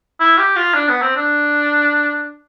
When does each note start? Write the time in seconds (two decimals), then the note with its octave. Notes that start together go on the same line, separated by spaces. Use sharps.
0.20 E4
0.38 G4
0.56 F4
0.74 D4
0.89 B3
1.02 C4
1.16 D4